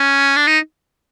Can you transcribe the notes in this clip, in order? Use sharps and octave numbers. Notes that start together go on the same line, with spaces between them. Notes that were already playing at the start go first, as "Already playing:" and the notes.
Already playing: C#4
D4
D#4